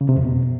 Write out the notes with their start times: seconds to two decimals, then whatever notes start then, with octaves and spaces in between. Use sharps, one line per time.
0.01 C#3
0.09 C3
0.17 F2
0.25 B2